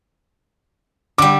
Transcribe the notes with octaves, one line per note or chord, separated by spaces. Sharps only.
D3 G3 D6